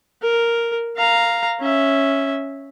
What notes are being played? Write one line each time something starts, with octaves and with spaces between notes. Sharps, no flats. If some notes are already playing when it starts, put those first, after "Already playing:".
A#4
F5 A#5
C#4 E5